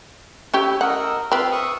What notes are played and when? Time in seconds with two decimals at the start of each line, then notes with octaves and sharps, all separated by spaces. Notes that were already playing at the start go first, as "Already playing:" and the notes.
0.54 A3 C#4 E4 G4
0.81 A#4 D#5 F#5 E6
1.32 C4 F4 B4 E5 F5
1.52 E5 C#6 D#6